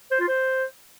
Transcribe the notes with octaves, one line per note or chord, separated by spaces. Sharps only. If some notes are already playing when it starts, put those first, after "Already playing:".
C5
F4
C5